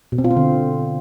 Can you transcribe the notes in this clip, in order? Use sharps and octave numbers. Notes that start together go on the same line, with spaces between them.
B2
C4
F4
C4
D3